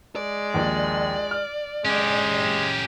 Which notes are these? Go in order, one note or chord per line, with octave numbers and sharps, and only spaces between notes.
G#3 D5
A#1 D#2
F6
G#3 C#4 G4